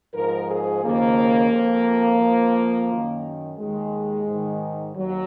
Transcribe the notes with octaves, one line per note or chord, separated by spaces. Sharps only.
G#2 F3 A#4
G#4
D#2 C#3 F3 A#3
F2 F3
F2 F3
F#2 D#3
D#2 D#3 G#3
G#2 D#3
D#2 F#3